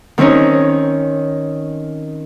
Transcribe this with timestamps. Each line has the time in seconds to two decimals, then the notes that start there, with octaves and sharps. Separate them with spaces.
0.18 D#3 C4 C#4 D#4 C#5